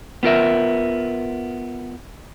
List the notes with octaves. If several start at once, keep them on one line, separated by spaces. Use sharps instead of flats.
B3 F4 A#4 E5